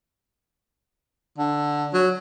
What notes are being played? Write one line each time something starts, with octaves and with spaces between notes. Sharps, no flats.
D3
F#3